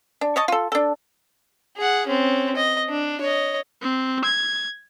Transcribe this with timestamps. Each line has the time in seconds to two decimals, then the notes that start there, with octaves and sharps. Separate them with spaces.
0.21 D4
0.36 C#5 D#5 A5
0.48 F4 A4
0.72 D4 A4
1.77 G#4 F#5
2.07 C4 C#4
2.56 D#5
2.89 D4
3.21 C#5 D#5
3.82 C4
4.24 G#6